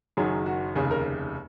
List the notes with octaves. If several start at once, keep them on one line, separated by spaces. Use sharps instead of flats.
F#1 F#2 D#3 F#3 G#4
F#4
F1 D#2 C#3 G#4
A#4